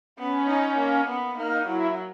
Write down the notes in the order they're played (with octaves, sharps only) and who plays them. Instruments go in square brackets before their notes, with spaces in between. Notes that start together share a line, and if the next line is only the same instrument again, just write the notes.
[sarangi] B3 [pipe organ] C#4
[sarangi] D#4
A#3
B3
[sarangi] A#3 [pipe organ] D#4
[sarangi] F#3 [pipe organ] E4